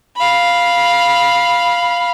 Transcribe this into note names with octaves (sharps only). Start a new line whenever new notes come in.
F5 B5